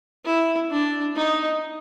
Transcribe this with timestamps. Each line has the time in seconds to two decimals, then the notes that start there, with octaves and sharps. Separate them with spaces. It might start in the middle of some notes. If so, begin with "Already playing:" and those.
0.25 E4
0.71 D4
1.15 D#4